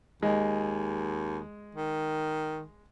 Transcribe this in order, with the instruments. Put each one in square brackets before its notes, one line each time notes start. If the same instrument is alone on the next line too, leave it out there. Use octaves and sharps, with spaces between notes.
[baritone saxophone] D#2 [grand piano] G#3
[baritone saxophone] D#3